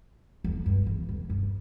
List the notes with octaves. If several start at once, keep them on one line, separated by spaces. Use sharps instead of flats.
F2
G2
E2
F2
G2